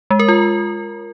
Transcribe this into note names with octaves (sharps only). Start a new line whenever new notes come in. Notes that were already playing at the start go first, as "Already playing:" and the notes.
G#3
A#4
F4